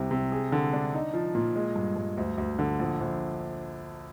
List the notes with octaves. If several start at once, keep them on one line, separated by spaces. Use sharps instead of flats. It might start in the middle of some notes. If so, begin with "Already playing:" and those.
Already playing: C2 C3
C3
G#4
D3
D4
D#4
F3
A#2
G#3
G2
G2
D2
D2
D3
A#1
A#1